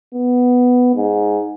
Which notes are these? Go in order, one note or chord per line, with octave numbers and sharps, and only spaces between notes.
B3
G#2